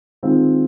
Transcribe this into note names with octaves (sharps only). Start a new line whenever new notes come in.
D#3 G#3 C4 F4